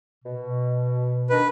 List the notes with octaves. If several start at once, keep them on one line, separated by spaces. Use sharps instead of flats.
B2
D#3 D4 A#4 B4